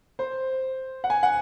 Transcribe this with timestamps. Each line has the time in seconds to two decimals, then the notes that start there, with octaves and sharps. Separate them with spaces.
0.19 C5
1.04 F#5
1.10 G#5
1.23 F#5